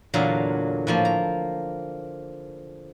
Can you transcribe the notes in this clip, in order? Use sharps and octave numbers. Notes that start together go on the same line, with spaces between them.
E2 A#2 D3 F#3 F5 A#5
A2 F3 A#3
A#5